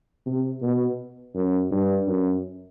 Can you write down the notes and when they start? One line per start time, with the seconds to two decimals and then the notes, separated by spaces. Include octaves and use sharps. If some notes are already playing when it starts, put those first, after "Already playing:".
0.26 C3
0.62 B2
1.35 F#2
1.71 G2
2.07 F#2